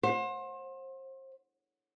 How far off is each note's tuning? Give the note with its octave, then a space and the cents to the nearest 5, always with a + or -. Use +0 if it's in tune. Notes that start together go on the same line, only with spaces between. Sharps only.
C5 +30 F#5 -30